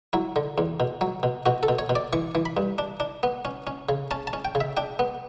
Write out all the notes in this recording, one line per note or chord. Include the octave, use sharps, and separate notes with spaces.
F#3 E4
D3
E2
B2
F#3
B2
B2 F#4
A4
B2
C#5
B2
D5
E3 C#6
E3
B5
G2
D4
D4
B3
C#4
C#4
C#3
C#4 A5
A5
C#4
G5
C#3
E5
D4 G5
B3